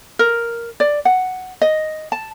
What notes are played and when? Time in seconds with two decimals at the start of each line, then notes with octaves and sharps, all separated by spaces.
0.19 A#4
0.80 D5
1.05 F#5
1.61 D#5
2.12 A5